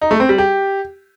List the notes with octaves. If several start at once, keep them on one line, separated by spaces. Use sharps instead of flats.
D#4
A3
C4
G3
G4